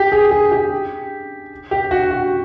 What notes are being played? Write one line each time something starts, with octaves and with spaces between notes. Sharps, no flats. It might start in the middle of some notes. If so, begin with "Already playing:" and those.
Already playing: G4
G#4
G#4
G4
G4
F#4
F#4